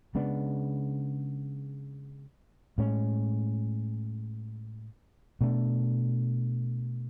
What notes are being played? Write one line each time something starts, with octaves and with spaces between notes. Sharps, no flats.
C#3 G#3 B3 D4
A2 G#3 C#4
B2 A3 D4